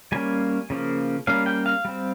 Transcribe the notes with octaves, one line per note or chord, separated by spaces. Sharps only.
G3 A#3 C#4 G#5
C#3 F3 A#3
G3 A#3 C#4 F5
G5
F5
G3 C4